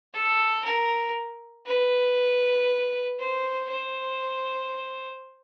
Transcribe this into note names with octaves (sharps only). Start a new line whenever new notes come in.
A4
A#4
B4
C5
C5